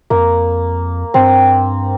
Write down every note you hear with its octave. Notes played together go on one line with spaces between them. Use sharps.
F2 A#3
G2 C4